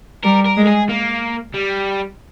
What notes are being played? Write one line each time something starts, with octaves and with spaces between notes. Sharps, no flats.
G3 A#4
A#4
G#3
G#4
A#3
G3